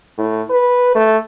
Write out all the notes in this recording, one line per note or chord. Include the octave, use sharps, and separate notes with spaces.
A2
B4
A3